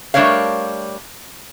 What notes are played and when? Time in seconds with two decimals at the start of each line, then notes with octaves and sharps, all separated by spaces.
0.14 G3 A3 D4 A#4 C#5 F5